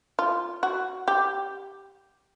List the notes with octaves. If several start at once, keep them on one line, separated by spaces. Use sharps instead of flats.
F4
F#4
G4